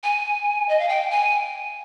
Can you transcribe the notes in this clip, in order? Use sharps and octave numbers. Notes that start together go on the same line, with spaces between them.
G#5
D#5
F5
G5
G#5